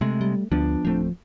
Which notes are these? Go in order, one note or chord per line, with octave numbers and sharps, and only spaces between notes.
C3 G#3 A3
G3
D2 F3 B3 D4
D1 F3 A3 C4